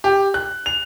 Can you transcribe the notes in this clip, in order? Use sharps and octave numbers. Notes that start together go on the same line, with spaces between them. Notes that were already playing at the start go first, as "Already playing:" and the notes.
G4
F#6
F7